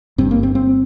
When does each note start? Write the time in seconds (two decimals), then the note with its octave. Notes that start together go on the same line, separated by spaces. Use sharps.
0.18 G1 G2 C4
0.31 A#3
0.43 C4
0.55 C4